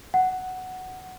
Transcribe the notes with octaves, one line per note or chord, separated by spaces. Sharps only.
F#5